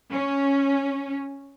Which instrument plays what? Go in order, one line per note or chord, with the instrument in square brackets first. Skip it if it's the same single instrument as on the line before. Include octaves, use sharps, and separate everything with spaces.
[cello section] C#4